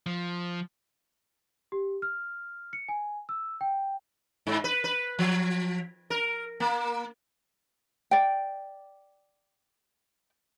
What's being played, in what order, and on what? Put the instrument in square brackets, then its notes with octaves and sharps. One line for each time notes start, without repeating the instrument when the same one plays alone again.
[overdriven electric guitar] F3
[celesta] G4
F6
C#7
G#5
E6
G5
[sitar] G#2
B4
B4
F3
A#4
A#3
[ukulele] D5 G5